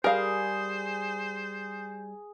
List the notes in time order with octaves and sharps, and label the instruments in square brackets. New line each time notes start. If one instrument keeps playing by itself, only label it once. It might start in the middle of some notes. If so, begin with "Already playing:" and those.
[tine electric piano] G3 [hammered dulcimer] G#4 [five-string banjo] A#4 F5 [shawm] C5